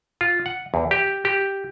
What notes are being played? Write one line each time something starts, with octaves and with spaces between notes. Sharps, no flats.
F4
F#5
E2
G4
G4